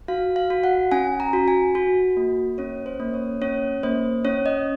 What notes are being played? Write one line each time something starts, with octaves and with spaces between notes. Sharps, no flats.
F#4 F5
F5
F#4
F#5
C#4 G#5
A#5
F#4
G#5
F#4
A#3
C#4 C#5
C5
A#3
C#5
C#4 C#5
A#3 C5
C#4 C#5
D#5